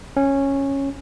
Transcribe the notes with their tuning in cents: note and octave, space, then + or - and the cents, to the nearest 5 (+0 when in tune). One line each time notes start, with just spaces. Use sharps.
C#4 -10